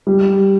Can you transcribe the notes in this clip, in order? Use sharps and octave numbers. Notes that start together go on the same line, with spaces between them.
G3